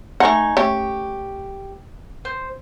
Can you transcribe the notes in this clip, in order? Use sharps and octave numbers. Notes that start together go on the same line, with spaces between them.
A3 D#4 F#5 G#5 C#6
A3 C#4 G4 C#6
C5